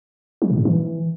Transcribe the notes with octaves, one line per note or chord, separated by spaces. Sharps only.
F#3
A#2
A2
E3